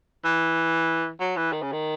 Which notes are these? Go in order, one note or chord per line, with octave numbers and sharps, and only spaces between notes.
E3
F#3
E3
D#3
C#3
D#3